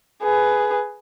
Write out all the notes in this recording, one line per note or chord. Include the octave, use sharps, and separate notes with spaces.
G#4 B4